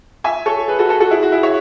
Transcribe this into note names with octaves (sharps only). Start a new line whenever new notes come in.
E5 G#5
A4 C#5
G#4 B4
F#4 A4
F#4 A4
F#4 A4
E4 G#4
F#4
E4 G#4
C#5 E5